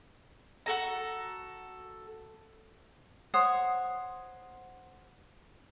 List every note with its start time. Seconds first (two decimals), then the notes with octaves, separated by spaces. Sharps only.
0.66 F#4 A4 A#5
3.34 C5 C#5 F#5 D#6